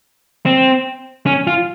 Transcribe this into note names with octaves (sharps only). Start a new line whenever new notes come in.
C4
C#4
F4